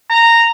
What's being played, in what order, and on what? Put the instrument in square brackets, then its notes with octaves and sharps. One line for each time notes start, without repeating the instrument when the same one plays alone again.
[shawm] A#5